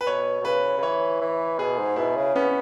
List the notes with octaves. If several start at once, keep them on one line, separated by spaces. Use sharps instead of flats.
B4
B2 C#5
B2
C#3 B4
C#3
E3 C#5
E3
B2 G#4
G#2
B2 E4
C#3
B3 C#4